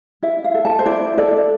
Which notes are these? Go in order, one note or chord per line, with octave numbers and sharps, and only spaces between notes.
E4 E5
F5
A4
A5
C5
E4 D5
A4 D5